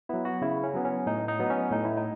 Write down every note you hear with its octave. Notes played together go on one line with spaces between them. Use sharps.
F#3 B3 E4
F#4
C#3 E4
C#4
F#3 B3
C#4
A2 D#4
D#4
F#3 B3
C#4
A2 D#4
E4
D#4